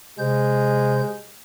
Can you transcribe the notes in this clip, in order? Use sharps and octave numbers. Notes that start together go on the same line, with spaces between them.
C3 G#3 C5 G6